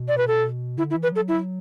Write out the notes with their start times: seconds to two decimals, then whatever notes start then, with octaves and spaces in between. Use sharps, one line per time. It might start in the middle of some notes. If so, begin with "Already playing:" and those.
Already playing: B2
0.08 D5
0.18 B4
0.28 A4
0.78 D3 E4
0.90 E4
0.95 E3
1.03 B4
1.12 F#3 A4
1.28 E4